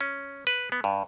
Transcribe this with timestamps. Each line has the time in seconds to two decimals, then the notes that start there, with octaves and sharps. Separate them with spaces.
0.01 C#4
0.47 B4
0.72 B3
0.84 G2